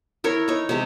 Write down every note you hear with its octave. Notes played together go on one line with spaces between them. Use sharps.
E4 A#4 C#5
D#4 C#5
C3 G#3